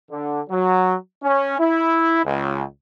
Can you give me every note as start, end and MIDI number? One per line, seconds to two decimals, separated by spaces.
0.10 0.41 50
0.49 0.95 54
1.23 1.59 61
1.59 2.22 64
2.24 2.63 37